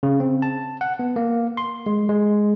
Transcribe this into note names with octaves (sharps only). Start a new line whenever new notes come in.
C#3
C4
A5
F#5
B3
A#3
C6
G#3
G#3